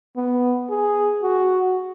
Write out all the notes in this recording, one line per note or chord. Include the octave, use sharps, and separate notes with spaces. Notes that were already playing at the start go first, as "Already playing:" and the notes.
B3
G#4
F#4